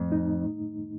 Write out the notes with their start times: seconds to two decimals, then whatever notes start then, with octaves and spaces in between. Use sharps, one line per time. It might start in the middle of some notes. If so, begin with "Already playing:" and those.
Already playing: F2 A2 A3
0.12 D#4